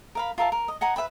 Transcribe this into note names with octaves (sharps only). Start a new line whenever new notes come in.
A#4 F5 B5
F4 A#4 E5 A5
A#4
D#5
D#5 F#5 G#5 A#5
B4 E5 G5 B5